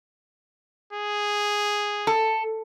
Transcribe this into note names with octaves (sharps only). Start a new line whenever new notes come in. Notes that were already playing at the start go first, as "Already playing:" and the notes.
G#4
A4